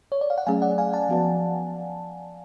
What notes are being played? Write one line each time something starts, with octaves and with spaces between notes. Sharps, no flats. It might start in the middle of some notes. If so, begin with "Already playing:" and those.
C#5
D5
F5
F#5
F#3 A3 C#4 G#4 F5 G#5
D5 F#5
F5 G#5
F#5 A5
F3 B3 F#4 B4 D5